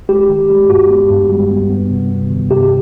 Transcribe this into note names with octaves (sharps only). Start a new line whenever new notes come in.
G#3 G4
D#3
G#3
G2 F#4
B3
G2
G3
B3
B3
C3
B3
D#3
C3 G4